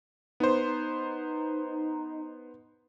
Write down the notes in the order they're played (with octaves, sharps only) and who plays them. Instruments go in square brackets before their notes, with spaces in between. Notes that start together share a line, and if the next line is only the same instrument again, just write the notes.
[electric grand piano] B3 C5 [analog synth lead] D#4